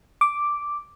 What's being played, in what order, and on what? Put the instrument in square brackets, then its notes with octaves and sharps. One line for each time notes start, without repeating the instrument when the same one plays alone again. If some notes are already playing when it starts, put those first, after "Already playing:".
[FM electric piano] D6